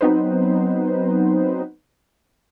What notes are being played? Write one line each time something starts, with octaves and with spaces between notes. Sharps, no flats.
F#3 B3 C4 D#4 B4 C5